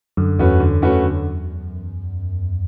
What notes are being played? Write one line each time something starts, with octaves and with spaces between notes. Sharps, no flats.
F#2 D3
E2 A3 C#4 F#4 B4
D3
A3 C#4 F#4 B4
D3